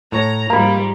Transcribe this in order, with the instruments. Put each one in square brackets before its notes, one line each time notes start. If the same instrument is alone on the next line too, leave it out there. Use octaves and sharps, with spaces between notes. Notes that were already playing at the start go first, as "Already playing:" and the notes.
[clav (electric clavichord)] A2 C#5 [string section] A#5
[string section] G#2 F3 G3 [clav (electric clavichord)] A#3 [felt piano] A#5 B5